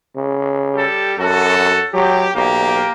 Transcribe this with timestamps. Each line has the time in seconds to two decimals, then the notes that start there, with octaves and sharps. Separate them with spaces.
0.16 C#3
0.75 G3 G4 A4
1.18 F#2 F#4 A4
1.94 F#3 G4
2.34 B1 A#3 G4 A#4